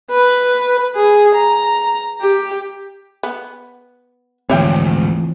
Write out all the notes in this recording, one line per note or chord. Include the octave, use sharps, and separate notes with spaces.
B4
G#4
A#5
G4
B3
D2 G#2 E3 F3 C4 C#5 E5 G5